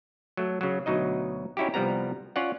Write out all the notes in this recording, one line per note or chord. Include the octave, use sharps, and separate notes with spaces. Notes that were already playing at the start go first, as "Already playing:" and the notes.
F#3 A3
C#3 F#3
D2 B2 F#3 D#4 D#5
C#4 D#4 E4 F#4 G4
C2 F3 G3 B3 A#5
C#4 F4 C#5 D5 F#5